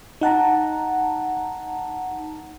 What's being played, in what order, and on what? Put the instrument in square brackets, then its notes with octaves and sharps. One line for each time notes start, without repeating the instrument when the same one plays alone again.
[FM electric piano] D#4 F#5 A5 A#5